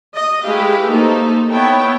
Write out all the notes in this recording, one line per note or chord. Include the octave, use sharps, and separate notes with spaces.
D#5
G#3 A3 E4 G4 B4 F5
A3 A#3 D#4 A4 C5
B3 E4 C#5 G5 A5